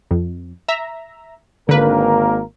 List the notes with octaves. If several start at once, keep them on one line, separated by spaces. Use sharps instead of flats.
F2
E5 A#5
G#1 D3 A#3 A#4 B4